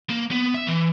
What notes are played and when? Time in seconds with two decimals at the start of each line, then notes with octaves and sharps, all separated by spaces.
0.10 A#3
0.31 B3
0.54 E5
0.67 E3